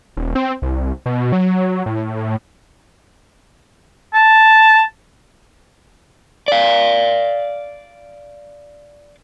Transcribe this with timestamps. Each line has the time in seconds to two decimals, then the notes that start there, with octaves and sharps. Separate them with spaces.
0.17 D#1
0.35 C4
0.62 C2
1.06 B2
1.32 F#3
1.86 A2
4.14 A5
6.48 D5 F5